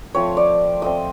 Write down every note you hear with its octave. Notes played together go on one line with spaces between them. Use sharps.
F3 A3 C4 C#5
D5
F3 A3 C4 D#5